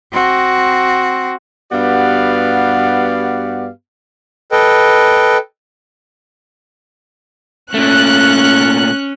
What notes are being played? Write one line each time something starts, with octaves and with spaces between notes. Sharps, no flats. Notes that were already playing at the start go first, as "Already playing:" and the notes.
C4 F#4
G2 B3 F#4 G4 D5 F5
A4 B4 D#5 G5
A#2 A3 C#4 F#6